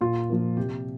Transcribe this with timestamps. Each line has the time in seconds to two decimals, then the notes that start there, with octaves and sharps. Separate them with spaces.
0.01 A#2 F4
0.30 F3 A#3
0.57 C3 G4